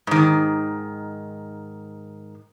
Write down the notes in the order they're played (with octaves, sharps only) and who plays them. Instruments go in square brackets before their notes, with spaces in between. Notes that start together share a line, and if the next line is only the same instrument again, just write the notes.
[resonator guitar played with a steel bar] G#2 D#3